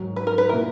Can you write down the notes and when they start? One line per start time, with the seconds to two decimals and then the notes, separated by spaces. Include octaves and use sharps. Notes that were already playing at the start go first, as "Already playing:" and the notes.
Already playing: G#2 D#3 F#3
0.16 B4
0.27 A#4
0.38 B4
0.49 A#2 A#3 E4 A#4